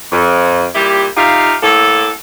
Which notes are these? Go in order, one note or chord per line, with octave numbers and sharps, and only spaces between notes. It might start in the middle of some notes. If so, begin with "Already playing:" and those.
F2
A#2 G3 E4 G4
D#4 F4 G4 E5 F5
A2 A#3 A4